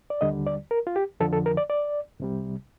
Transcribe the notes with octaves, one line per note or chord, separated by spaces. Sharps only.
D5
D#2 D3 G3 D#5
D5
A#4
F4
G4
F2 D3 F3 A4
A4
A#4
D5
D5
C2 C3 G3